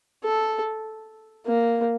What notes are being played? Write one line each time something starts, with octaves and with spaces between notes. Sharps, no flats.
A4
A#3